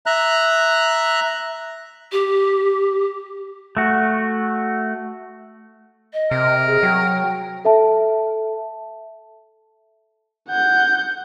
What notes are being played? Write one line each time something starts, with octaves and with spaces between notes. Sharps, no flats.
E5 A#5 F#6
G4
A3 F#4
D#5
C3 A#4
G#4
F#3 G5
A4 E5 A5
F#5 G6